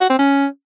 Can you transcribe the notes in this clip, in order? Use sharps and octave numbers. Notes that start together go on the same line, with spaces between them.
F#4
C4
C#4